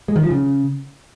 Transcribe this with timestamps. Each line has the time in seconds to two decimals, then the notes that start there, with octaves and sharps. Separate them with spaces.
0.08 G#3
0.16 D#3
0.23 F3
0.30 C#3